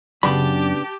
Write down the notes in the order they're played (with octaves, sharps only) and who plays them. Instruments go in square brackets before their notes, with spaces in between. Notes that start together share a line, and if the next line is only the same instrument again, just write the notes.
[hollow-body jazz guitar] F#2 B5 [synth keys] C#3 B3 D4 [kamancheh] G4 A5